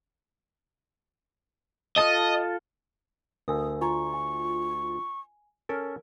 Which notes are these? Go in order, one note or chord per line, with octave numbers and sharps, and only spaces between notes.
F4 A4 D#5 A5
D2 A#4 G#5 D#6 E6
F4 G#5 A#5 C#6
G#5
C#4 A4 A#4